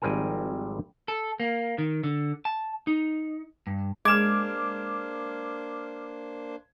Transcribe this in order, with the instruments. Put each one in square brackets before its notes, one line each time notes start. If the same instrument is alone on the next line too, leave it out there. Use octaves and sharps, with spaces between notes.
[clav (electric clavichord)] G#1 F3 G3 C4 A#4 G#5
[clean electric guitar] A4
A#3
D#3
D3
A5
D#4
G2
[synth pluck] G#3 [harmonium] A#3 D4 C5 [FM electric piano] D6 F6 [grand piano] G#6 E7